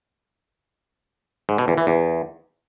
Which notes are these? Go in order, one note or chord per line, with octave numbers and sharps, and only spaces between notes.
G#2
B2
E2
E3
E2